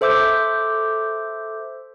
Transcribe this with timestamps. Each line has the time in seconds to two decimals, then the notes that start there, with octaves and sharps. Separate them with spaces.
0.01 A4 C5 E5 D6 E6 G6